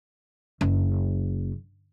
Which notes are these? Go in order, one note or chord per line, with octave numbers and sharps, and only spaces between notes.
F#1